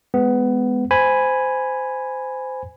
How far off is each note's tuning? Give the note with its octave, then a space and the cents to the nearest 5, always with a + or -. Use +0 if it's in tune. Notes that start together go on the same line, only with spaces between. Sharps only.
G#3 +0 B3 +15
C5 -20 G#5 +0 B5 +0